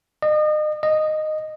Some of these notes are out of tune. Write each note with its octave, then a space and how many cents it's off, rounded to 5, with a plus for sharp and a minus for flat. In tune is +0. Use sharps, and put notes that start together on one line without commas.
D#5 -35
D#5 -10